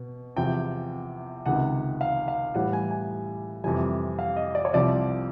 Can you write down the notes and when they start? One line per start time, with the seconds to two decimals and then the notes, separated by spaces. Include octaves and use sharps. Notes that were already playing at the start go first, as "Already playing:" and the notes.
Already playing: B2
0.36 E2 C3 F3 G5
1.46 C#2 C3 D#3 F#5
2.01 F5
2.28 F5
2.55 A2 E3 G3 F#5
2.73 G#5
2.91 G#5
3.64 F2 C3 E3 G3 G#5
4.19 F5
4.36 D#5
4.55 D5
4.65 C#5
4.73 C2 C3 F3 D5